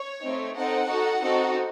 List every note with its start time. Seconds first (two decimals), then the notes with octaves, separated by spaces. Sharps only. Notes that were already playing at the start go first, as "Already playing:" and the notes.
Already playing: C#5
0.23 A3 C4 D#4
0.56 C4 D#4 A4 F#5
0.89 D#4 F#4 A4
1.22 C4 D#4 F#4 A4